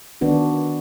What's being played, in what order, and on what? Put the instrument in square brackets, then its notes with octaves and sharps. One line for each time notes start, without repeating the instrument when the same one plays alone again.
[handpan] D#3 B3 D4 F#4